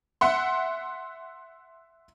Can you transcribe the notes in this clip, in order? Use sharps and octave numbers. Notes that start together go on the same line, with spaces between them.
E5 F#5 C6